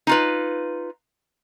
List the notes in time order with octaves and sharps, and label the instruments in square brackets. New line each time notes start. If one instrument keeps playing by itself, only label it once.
[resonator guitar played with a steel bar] D#4 F4 B4